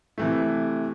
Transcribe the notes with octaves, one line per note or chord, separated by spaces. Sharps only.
C3 E3 A3